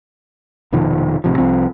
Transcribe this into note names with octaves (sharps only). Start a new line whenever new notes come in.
F1 B2 D#3 F3
A1 C3 F3
C2 F3 C4